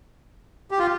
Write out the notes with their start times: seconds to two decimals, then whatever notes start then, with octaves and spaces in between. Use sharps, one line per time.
0.71 G4
0.79 F4